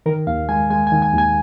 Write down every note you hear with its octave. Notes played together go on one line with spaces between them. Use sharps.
D#3 A#4
D#2 F5
G#3 G#5
G#3 G#5
G#5
D#3
G#5
D#2 G#5